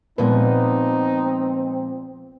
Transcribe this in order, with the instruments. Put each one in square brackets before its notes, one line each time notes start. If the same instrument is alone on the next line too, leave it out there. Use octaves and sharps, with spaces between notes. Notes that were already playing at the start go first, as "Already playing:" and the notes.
[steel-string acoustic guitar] A#2 F3 G#3 [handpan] B3 B4 [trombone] C4 [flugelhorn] D#4